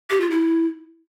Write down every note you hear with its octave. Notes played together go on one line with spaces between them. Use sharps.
G4
F4
E4